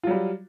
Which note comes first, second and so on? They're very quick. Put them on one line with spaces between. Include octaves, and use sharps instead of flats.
F4 F#3 G3